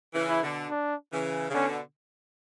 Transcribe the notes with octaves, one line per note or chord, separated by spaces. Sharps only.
C#3 E3
E4
B2 D3
D4
C#3 E3
C#3
B2 D3 C#4